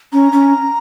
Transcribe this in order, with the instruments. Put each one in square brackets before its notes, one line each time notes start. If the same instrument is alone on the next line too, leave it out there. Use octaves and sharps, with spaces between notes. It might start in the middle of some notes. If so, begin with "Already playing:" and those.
[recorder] C#4 [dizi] A#5
[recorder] C#4